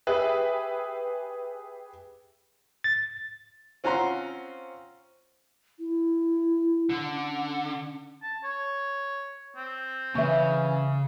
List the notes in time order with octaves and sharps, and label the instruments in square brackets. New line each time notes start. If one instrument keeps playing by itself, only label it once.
[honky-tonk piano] G4 G#4 B4 E5
[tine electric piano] A6
[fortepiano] C4 C#4 F4 F#5 A#5 C6
[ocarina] E4
[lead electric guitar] D3
[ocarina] C#4
[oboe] A5
C#5
C4
[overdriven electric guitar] C#3 [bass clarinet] E3 [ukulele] C#4 E5